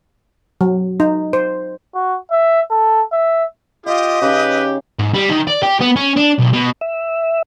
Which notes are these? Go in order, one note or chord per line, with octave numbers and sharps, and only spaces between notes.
F#3
D#4
C5
F#4
E5
A4
E5
F4 G4 D#5 F5
C#3 D#4 G4 B4
G#2
G3
D#3
D5
G4
B3
C#4
D4
B1
B2
E5